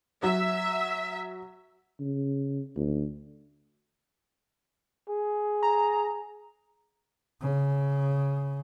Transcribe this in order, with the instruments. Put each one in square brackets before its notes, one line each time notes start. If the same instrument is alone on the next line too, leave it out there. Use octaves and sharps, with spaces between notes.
[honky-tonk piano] F#3 [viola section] E5
[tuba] C#3
D2
[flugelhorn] G#4
[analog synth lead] A#5
[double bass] C#3